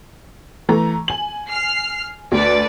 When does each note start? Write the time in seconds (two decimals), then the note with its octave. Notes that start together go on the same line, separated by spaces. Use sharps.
0.69 E3 A3 A#5
1.08 G#5 F#7
1.51 F6 C7
2.32 D2 A4 B4 D5